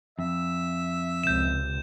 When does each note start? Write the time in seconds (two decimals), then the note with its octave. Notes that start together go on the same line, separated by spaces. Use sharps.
0.19 F2 E5
1.24 C#2 C3 G6 E7